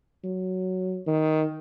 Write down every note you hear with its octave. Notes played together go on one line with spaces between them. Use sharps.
F#3
D#3